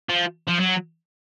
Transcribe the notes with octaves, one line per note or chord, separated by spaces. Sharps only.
F3
F3
F#3